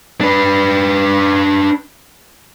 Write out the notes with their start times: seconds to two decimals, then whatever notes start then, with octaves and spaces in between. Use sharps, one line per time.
0.21 D4 B4